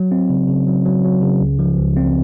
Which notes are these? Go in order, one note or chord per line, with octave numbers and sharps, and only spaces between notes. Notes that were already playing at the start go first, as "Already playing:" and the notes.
Already playing: F#3
C4
C#3
C#3
F#3
F#3
F#3
C#3
C#2
F3
C#2
C4